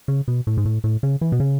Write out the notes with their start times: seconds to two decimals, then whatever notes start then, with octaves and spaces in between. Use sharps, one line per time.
0.08 C#3
0.28 B2
0.47 A2
0.57 G#2
0.65 A2
0.84 A2
1.03 C#3
1.21 E3
1.32 B2
1.40 C#3